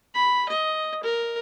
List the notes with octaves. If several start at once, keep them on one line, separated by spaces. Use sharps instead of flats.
B5
D#5
A#4